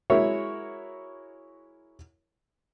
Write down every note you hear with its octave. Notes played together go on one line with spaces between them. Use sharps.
G#3 E4 F#4 A#4 C#5 E5